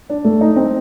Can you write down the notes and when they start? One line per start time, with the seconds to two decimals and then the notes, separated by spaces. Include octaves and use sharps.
0.10 D4
0.25 A3
0.41 D#4
0.56 C4